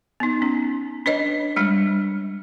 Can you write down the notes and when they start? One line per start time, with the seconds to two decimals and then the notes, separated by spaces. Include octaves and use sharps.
0.20 B3 D#4
0.42 C#4
1.06 D4 B4 C#5 D#5
1.56 G3 G#3 D4